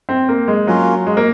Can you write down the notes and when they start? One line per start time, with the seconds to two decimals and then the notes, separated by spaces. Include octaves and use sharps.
0.09 C4
0.29 A#3
0.48 G#3
0.67 F#3 A#3 C#4 F4
1.07 G#3
1.17 A#3